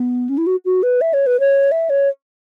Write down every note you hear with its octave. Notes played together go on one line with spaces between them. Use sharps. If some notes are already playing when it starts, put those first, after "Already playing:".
Already playing: B3
C#4
E4
F#4
F#4
B4
E5
C#5
B4
C#5
E5
C#5